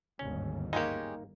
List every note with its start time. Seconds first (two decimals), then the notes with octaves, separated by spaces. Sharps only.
0.19 G1 D#2 G#2 C#4
0.73 G#3 A#3 C#4 D#4 G4